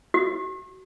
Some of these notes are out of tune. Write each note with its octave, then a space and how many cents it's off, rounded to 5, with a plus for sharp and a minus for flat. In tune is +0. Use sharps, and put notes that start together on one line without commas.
F#4 +20